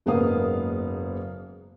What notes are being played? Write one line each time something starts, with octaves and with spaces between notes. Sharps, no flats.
F#1 G#2 A#3 B3 F5 D#6